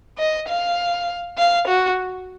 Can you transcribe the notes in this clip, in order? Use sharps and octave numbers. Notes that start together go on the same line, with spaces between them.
D#5
F5
F5
F#4